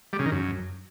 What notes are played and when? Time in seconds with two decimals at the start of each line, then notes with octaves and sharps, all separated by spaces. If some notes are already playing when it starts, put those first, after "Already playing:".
0.13 G3
0.19 C#3
0.26 D#3
0.32 F#2